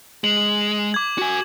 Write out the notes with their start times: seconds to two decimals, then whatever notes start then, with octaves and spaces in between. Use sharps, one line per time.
0.24 G#3 F#7
0.94 D6 G#6
1.19 F#4 G#5